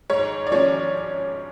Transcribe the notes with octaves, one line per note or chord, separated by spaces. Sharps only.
G#2 C#5
D5
F3 G#3 C#4 C#5